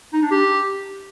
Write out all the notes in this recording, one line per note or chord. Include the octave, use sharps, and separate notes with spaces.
D#4
D4
G4